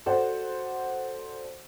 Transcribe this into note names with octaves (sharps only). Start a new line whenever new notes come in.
F#4 A4 C5 D5 F#5